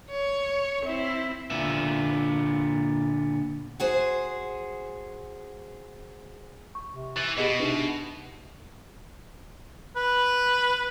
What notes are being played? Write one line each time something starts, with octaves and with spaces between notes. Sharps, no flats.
C#5
C4 E4
A#2 D3 B3 E5
F#4 G#4 C5
C#6
C3
E3 A6
B2 B3 G4 G#4 D#5
C3 D4 D#4 B4
B4